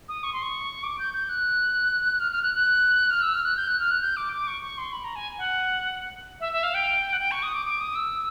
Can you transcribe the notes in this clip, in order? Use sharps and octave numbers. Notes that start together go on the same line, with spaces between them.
D#6
C#6
C6
C#6
D6
G6
G6
F#6
F6
F6
F#6
F#6
F6
E6
F6
F#6
G6
F#6
F6
F#6
G6
D6
D6
C#6
C#6
C6
B5
A#5
G#5
F#5
E5
E5
F5
G5
F#5
G5
C#6
D#6
D6
D6
D#6
E6